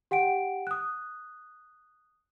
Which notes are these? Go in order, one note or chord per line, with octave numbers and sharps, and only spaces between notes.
G4 F#5 G5 D7
D#6 F#6